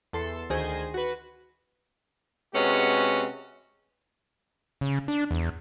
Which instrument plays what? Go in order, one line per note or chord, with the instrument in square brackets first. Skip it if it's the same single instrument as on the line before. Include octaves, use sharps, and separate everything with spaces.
[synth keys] E2 A4 C6
D2 D#3 G#4 C5 G#5 A#6
F#4 B4
[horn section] C3 G#3 B3 C#4 F#4
[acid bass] C#3
D4
E2